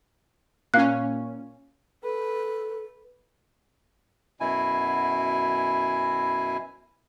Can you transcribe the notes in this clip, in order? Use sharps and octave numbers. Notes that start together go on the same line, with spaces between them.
A#2 C#4 F5 F#6
A4 B4
F#2 B2 E4 G#5